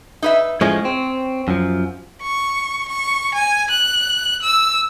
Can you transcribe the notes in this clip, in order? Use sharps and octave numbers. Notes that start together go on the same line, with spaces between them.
D#4 B4 E5
A2 F3 G#3 C#4
C4
F#2 F3
C#6
C#6
G#5
F#6
E6